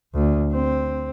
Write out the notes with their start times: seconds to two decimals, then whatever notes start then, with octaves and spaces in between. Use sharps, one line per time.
0.14 D2
0.52 C4